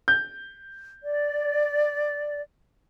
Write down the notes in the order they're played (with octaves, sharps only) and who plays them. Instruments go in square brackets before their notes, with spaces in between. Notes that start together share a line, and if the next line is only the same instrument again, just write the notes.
[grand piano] G6
[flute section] D5